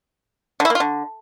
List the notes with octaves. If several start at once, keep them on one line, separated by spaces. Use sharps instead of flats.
D3
E4
A#3
F4
D3